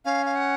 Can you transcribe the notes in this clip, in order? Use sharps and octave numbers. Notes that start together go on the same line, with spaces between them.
C#4 F5
F5
F#5